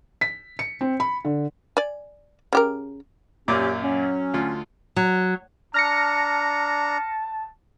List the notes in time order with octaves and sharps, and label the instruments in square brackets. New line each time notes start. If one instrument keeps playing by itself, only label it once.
[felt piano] B6
C#7
C4
B5
D3
[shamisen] D5 G#5
C#3 G4 A#4
[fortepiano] F#2 A#2 D6 [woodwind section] C#4 G4
[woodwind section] F#3 C#4
[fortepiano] D2 F4
[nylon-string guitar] F#3
[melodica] D4 A#5 [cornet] A5 [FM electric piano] F6 A#6 C#7